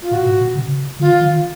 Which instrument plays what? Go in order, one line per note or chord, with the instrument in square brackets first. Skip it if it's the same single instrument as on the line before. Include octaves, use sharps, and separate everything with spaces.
[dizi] F4
[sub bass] A#2 [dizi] F#4
[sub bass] A2
A#2
C#3
[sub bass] D3 [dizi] F4
[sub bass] D#3